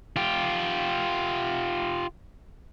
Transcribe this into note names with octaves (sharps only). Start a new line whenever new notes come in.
F4 G4